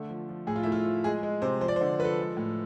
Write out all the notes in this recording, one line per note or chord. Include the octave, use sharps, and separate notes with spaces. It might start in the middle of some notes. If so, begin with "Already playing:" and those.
Already playing: D3 A3
F3
F3
A2 G#4
F4
A3 E4
F4
F3
G#3 G#4
G#3
C3 C5
F3 C5
D5
C5
D3
F3 B4
A4
G#3
A2